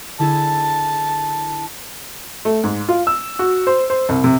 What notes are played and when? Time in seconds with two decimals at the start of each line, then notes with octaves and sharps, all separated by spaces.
0.19 D3 E4 G#4 A5
2.45 A3
2.63 G#2
2.89 F4
3.07 E6
3.39 F#4
3.67 C5
3.90 C5
4.09 C2
4.24 C3